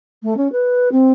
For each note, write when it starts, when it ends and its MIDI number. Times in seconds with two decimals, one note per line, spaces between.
0.23 0.36 57
0.37 0.50 61
0.52 0.88 71
0.91 1.12 60